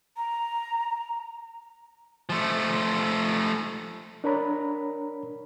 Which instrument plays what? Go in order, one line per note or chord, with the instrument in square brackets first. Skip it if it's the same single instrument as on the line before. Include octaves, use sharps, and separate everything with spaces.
[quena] A#5
[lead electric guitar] F3 A3
[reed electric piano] D4 A#4 C#5 A#5 B5